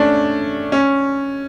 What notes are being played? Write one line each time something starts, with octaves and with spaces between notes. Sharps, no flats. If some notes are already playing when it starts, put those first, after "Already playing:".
Already playing: A3 C#4 D4
C#4